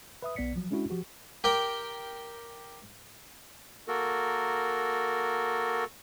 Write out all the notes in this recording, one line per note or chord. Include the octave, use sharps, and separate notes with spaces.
B4 E5 D#6
B1 B3 D5 B6 C#7
F3 F#3
G#3 C#4 D4 E4 F#4
F3 F#4 G4
G4 A#4 G5
A#3 F#4 A4 A#4